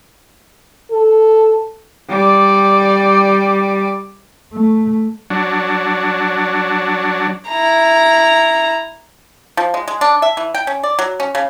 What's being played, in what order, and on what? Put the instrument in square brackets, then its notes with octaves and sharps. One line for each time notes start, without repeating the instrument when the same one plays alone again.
[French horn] A4
[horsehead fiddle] G3 D5
[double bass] A3
[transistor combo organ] F#3 D4
[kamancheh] E4 A#5
[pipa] F3
G#3
G#3
D4
E5
E3
G5
C#4
D5
F#3
C#4
C#3